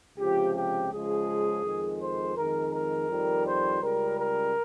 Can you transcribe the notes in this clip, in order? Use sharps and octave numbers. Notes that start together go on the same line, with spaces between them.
C#2 C3 F3 G4
G4
C#2 C#3 F3 G#3 G#4
F2 D#3 G#3
C5
F2 D#3 G#3 A#4
A#4
F2 D#3 G3
C5
C#2 C#3 G3 A#4
A#4